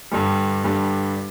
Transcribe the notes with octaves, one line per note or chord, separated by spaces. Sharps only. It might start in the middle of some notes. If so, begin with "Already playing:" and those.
G2 D3 G3
G2 D3 G3